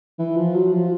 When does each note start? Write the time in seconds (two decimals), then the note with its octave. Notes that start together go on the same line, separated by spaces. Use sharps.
0.19 E3
0.36 F3
0.55 F#3
0.72 F3